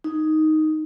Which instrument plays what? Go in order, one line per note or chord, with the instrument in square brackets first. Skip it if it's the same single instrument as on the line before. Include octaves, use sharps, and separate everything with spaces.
[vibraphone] D#4